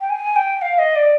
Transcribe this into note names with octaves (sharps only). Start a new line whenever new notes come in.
G5
G#5
G5
F5
D#5
D5